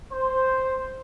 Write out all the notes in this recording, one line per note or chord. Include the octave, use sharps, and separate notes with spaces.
C5